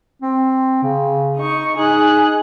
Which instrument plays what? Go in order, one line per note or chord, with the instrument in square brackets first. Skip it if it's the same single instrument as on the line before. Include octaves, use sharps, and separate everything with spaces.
[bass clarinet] C4
C#3
[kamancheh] D#4 C#6
[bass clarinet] D#4 [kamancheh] G#4 F#6